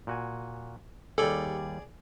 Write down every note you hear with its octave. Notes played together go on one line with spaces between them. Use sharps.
A#2 F#4 G#5
D#2 G3 G#4 A4 D5 G#5